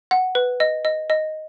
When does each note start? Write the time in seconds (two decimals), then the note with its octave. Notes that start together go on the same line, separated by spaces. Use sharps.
0.11 F#5
0.35 B4
0.60 D#5
0.85 D#5
1.10 D#5